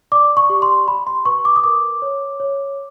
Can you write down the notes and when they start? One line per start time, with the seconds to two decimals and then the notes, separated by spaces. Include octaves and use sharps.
0.12 D5 D6
0.37 C#6
0.50 G4
0.62 C6
0.87 G4 B5
1.07 C6
1.25 B4 C#6
1.45 D6
1.56 D#6
1.64 A#4 D6
2.02 C#5
2.40 C#5